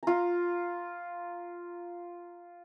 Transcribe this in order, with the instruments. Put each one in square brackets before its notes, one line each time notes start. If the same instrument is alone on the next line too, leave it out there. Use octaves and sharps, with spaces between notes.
[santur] F4 A#5